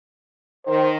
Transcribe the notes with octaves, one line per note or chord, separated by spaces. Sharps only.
D#3 C5